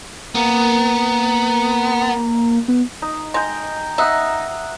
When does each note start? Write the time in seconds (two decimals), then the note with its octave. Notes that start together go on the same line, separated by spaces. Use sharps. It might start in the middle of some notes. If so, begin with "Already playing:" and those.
0.35 A#3 B3 A#5
2.68 B3
3.02 D#4
3.34 G#3 G5 A#5
3.98 D#4 E5 F#5 D#6